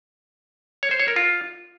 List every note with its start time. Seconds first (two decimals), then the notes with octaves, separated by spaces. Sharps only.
0.83 C#5
0.91 C5
1.00 C#5
1.08 A#4
1.16 F4